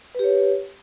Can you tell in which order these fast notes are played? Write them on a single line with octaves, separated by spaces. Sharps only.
B4 G4 C#5